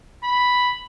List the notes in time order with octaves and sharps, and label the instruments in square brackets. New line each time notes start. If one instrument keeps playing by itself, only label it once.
[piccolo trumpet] B5